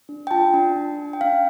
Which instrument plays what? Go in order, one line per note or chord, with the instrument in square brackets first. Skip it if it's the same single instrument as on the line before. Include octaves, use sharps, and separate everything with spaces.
[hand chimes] D4
G5
F4 A5
D4
D4
D4
G5
C#4 F5